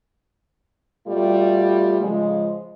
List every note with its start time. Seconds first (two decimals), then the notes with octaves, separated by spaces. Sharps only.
1.07 B2 G3 A3 F4
2.01 C#3 F3 G#3